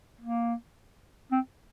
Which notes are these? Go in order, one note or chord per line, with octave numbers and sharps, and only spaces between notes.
A#3
C4